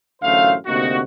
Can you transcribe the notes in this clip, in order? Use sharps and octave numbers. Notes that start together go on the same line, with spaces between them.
A1 F#2 D3 A3 C5 F5
D2 C3 A#3 D#4 F#4